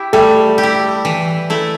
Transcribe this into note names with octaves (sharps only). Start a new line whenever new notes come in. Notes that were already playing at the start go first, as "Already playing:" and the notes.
Already playing: E4 G4
G3 A3 A4
G4
E4
E3
A3 E4